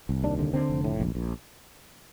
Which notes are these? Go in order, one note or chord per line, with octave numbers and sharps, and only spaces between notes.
C2
D#2 D4
D3
D3 C4
F1
A2
A#1
A#1